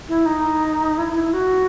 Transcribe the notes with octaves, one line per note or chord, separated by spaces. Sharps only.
E4
D#4
E4
E4
F#4